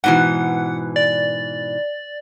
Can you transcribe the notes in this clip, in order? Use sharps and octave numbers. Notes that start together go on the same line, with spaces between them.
G#2 B2 E3 F#5
D5